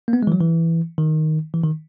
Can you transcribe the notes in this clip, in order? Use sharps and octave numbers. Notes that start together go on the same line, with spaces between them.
A#3
B3
G#3
E3
F#3
E3
D#3
E3
D#3